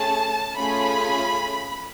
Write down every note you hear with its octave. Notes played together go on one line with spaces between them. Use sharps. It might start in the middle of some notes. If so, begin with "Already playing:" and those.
Already playing: A3 C#4 G#4 A5
A3 C#4 F4 G#4 B5